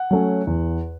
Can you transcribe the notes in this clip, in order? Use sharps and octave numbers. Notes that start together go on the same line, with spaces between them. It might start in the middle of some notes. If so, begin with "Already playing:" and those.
Already playing: F#5
F#3 A3 C#4
E2